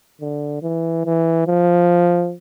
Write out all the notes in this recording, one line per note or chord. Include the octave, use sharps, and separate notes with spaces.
D3
E3
E3
F3